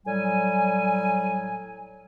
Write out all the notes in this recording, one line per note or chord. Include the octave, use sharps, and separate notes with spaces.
A2 F#3 G3 G#5